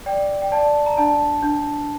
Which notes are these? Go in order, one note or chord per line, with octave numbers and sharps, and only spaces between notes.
D5 G5
G5
D5 A5
A#5
D4 A5
D4